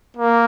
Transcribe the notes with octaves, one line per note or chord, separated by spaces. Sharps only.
A#3